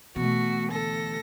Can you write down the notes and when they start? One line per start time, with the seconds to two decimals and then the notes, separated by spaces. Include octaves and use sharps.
0.16 B2 E3 A3 F#4
0.70 D2 A4 A#6